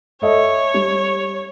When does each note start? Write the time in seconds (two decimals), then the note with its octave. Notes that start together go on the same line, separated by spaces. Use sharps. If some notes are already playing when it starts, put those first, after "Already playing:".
0.22 A4 C#5 D#5 E5
0.74 G3